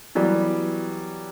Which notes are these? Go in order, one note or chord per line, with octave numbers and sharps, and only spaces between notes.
E3 F#3 G3 B3 G4